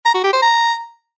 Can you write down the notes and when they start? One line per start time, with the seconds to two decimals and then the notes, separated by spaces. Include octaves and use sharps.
0.05 A#5
0.15 F#4
0.24 G4
0.33 C5
0.42 A#5